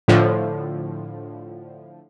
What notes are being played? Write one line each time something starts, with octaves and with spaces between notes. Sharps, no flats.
A2 D3 F3